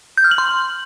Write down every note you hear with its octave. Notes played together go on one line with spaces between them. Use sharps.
G6
F6
F#7
C6